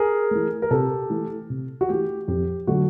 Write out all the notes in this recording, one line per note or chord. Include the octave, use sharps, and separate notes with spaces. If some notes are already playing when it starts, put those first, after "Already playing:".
Already playing: G#4 A#4
E3 A3
A#4
C3 G4 A4
E3 A3
C3
F#4
E3 A3 G4
F2 G4
D3 F#3 A3 F#4